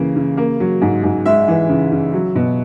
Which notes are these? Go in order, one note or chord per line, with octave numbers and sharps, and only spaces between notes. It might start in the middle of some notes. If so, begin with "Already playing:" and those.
Already playing: C#3 E3 A#3
C#3
A#3
F#3
G#2
G#2
G#3 E5
E3
C#3
C#3
F#3
B2